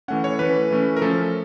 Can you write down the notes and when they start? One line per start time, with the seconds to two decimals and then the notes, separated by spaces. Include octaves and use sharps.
0.08 E3 A3 C#4 F#5
0.24 C#5
0.39 E3 A3 C#4 B4
0.71 E3 A3 C#4
0.97 A#4
1.02 F3 A3 C#4 A4